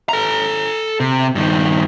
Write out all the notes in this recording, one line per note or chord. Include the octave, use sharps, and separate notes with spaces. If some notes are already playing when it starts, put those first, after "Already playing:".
A4 A#5
C3
G2 D#3